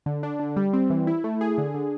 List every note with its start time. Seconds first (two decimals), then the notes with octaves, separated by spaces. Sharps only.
0.06 D3
0.23 D4
0.39 D3
0.56 G3
0.73 C4
0.90 E3
1.07 E4
1.24 A3
1.41 G#4
1.58 D3
1.74 D3